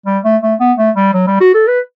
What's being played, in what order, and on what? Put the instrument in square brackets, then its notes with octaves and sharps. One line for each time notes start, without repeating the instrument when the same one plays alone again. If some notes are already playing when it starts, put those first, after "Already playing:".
[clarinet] G3
A3
A3
B3
A3
G3
F#3
G3
F#4
A4
B4